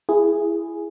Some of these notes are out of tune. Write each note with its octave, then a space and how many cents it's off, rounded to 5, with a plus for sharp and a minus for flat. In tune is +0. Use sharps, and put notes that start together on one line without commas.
E4 +20 G#4 +0